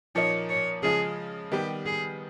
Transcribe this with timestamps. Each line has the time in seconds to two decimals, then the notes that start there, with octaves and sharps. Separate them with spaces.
0.15 A#2 F3 A#3 D#4 C#5
0.49 C#5
0.83 C#3 F3 G#3 G#4
1.52 D#3 G3 B3 G4
1.86 G#4